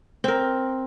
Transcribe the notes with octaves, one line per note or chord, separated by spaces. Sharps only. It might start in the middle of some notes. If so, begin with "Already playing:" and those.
C4 A#4